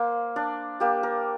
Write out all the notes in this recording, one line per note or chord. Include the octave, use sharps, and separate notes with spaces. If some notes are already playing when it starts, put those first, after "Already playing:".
Already playing: A#3 C5
D4 D5
A#3 G4
A#4